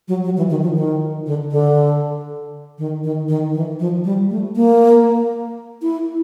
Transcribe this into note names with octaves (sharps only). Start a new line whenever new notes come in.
F#3
F#3
E3
D#3
F3
D#3
D3
D3
D#3
D#3
D#3
E3
F3
G3
A3
A#3
E4